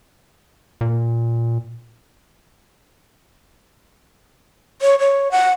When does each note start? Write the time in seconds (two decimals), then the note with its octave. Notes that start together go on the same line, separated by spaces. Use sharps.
0.81 A#2
4.82 C#5
4.99 C#5
5.31 F#5